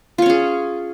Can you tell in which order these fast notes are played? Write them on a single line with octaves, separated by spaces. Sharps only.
F4 C#5 C#4 G#4